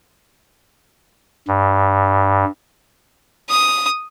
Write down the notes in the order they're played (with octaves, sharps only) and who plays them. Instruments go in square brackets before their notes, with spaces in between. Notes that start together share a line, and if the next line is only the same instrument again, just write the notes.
[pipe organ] G2
[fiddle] D#6